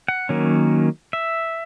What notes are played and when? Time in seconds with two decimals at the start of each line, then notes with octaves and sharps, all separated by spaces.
0.08 F#5
0.29 D#3 F#3 A#3 C#4
1.13 E5